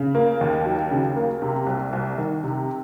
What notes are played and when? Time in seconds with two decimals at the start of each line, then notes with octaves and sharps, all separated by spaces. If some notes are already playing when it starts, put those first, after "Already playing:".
Already playing: C#3
0.15 A#3
0.41 D#2
0.65 F#3
0.91 C#3
1.16 A#3
1.42 C3
1.67 C2
1.93 C2
2.18 D#3
2.44 C3